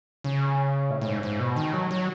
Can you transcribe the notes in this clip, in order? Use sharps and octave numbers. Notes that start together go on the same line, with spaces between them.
C#3
A2
A2
G#2
G#2
B2
D#3
F#3
F#3